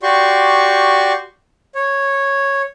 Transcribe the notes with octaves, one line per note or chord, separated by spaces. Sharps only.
F#4 G4 D5 C6 C#6
C#5